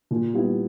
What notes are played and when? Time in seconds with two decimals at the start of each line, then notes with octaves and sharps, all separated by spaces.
0.11 A#2
0.34 G3 B3 E4